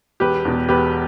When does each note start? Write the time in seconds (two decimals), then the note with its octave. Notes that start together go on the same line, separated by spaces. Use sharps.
0.20 E1 G4 B4
0.45 E2 B2
0.69 E1 G4 B4